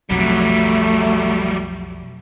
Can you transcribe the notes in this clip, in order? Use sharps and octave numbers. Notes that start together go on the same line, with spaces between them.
B1 F2 F#3 G3 A3